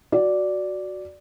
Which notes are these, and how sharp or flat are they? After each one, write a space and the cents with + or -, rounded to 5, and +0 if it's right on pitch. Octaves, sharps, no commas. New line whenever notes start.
F#4 +0 D5 -5